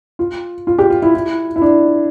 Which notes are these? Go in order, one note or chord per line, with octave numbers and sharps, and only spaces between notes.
F4
F4
G4
F4
E4
E4
E4
D4